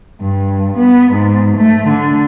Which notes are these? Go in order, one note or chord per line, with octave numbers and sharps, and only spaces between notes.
G2
B3
G#2
A3
D3